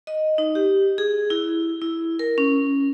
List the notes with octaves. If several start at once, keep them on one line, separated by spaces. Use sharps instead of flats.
D#5
D#4
G4
G#4
E4
E4
A#4
C#4